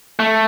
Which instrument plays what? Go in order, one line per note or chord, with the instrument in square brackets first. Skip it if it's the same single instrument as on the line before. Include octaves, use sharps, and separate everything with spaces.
[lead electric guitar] A3